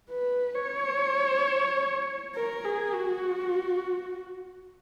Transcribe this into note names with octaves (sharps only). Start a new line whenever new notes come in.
B4
C#5
A#4
G#4
F#4